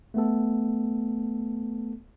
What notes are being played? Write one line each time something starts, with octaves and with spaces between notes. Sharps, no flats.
A3 B3 A4